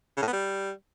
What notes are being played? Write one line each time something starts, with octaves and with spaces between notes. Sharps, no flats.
C#3
A2
B3
G3